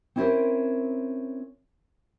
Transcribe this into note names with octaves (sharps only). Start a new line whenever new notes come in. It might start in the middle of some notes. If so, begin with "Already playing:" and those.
C4 C#4 E4 G#4 A#4 C5